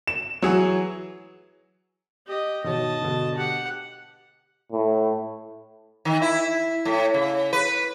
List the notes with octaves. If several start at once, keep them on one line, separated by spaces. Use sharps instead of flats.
E7
E3 F#3 G#4 C#5
G4 D#5
B2 D#3 C#5 D#5 A5
B2 D3
G4 F#5
A2
D#3
E4
A2
C#3
B4